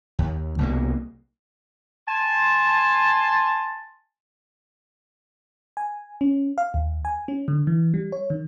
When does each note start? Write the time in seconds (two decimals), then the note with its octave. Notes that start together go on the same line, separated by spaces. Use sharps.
0.19 D#2
0.58 C2 B2 A#3
2.08 G#5 A5 C6
5.77 G#5
6.21 C#4
6.58 F5
6.74 D#2
7.05 G#5
7.28 C#4
7.48 D3
7.67 E3
7.94 G3
8.12 C#5
8.30 D#3